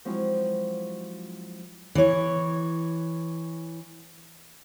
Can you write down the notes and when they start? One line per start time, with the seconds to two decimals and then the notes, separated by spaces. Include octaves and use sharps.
0.05 F3 F#3 G#3 C4 E4
1.95 E3 C#5